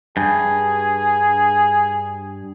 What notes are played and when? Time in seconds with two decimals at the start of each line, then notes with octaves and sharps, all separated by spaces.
0.17 G2 G#4